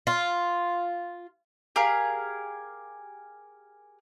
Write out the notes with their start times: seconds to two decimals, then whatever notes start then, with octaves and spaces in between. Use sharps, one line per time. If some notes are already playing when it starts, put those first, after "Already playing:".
0.07 F4
1.76 G4 G#4 A#4 F5